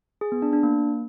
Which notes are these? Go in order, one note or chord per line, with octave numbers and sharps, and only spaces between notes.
G#4
B3
D4
D4
A#3